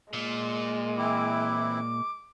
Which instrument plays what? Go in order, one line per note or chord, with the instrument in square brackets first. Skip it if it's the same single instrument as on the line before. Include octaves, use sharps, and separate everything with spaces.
[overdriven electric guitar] A#2 [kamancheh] G#3
[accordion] E3 C4 E4 [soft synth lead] D6